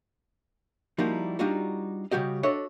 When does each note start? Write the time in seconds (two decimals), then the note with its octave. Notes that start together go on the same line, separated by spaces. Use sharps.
0.98 F3 G3 A#3 D#4 E4 F#4
1.39 G3 D4 D#4 F4 F#4
2.12 C#3 G3 F#4 G4 D#5
2.43 D4 F#4 A4 C#5 D#5 E5